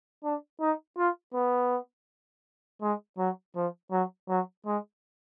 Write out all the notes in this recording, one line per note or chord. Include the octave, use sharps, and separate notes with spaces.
D4
D#4
F4
B3
G#3
F#3
F3
F#3
F#3
G#3